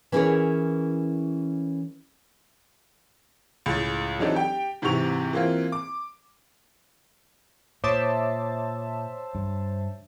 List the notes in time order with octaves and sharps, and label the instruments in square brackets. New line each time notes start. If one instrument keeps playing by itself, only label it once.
[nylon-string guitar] E3 C#4 E4 G#4 A#4 C#5
[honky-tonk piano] C#2 A2 A6
E3 F#3 C4 D4 D#4 A4
G4 G5
G#2 C3 E3 G4 C#6 F7
E3 A#3 C4 F4
D6
[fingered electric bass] A#2 [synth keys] C5 E5 A5 [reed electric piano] C#5 D6 D#6
[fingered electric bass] G2